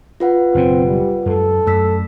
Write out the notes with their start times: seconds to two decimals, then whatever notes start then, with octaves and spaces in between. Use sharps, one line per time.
0.20 F4 B4 F#5
0.55 F#1 F#2 B2 C4
0.86 G3
1.26 F#2 G#3 A4
1.67 F#2 A3 E6 B6